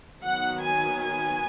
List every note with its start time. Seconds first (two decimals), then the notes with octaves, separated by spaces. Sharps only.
0.24 D#3 F#3 B3 F#5
0.63 G#5
1.04 G#5